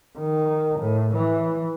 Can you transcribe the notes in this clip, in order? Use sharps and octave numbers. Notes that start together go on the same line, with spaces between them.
D#3
A2
E3